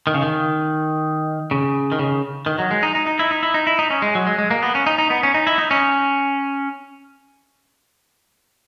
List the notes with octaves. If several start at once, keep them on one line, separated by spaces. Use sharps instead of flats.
D#3
C#3
D#3
C#3
D#3
C#3
D#3
F#3
G#3
D#4
D#4
D#4
E4
D#4
E4
D#4
E4
D#4
C#4
G#3
F#3
G#3
G#3
A#3
B3
C#4
D#4
D#4
B3
C#4
D#4
E4
D#4
C#4